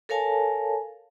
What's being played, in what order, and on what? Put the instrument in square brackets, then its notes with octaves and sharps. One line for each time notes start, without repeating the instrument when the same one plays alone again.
[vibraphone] A4 A#4 C#5 F5 G#5 A5